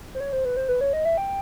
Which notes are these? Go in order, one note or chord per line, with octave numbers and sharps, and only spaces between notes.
C5
C#5
C5
B4
C5
B4
C#5
D#5
E5
G5